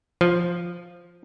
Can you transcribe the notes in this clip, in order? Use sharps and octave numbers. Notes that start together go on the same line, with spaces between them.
F3